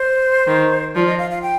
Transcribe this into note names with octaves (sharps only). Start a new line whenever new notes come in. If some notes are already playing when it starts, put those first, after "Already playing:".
Already playing: C5
D#3
F3 D5
D#5
F5
F5
G5